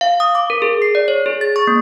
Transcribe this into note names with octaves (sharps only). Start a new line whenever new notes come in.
F5
D#6
D6
A#4
G#4
C7
D5
C#5
G#4
A6
C#6
A#3